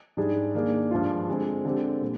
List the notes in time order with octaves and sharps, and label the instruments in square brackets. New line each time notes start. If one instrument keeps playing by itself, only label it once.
[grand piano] G#2 G3 D4 G#4
D#3 A#3 D4 G#4
G2 F3 G#3 D4 F4
D3 G#3 C4
D3 G#3 C4 G4
A#2 G3